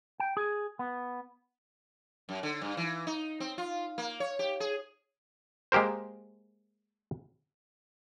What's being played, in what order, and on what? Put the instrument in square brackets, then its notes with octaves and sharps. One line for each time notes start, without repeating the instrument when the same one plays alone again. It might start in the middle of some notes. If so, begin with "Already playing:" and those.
[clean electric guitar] G5
G#4
B3
[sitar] F#2
D3
G2
E3
D#4
C4
F4
A#3
C#5
G4
G#4
[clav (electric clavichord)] G#3 A#3 G4 A#4 C5